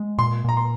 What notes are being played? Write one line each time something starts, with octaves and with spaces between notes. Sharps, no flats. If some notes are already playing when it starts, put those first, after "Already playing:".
Already playing: G#3
A#2 C6
A#2 A#5
C6